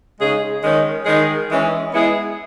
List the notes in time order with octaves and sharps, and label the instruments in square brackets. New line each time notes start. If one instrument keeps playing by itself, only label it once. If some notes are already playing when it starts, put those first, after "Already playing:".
[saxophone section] C#3 G#3 D#4 G#4
D#3 G#3 C#4
D#3 G#3 D#4 G#4
E3 G#3 C#4
G#3 B3 E4 G#4